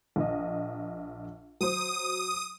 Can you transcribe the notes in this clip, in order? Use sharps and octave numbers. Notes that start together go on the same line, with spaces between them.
A#1 D#5
F#3 C5 D#6